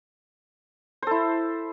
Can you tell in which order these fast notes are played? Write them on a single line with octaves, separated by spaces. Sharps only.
C5 A4 E4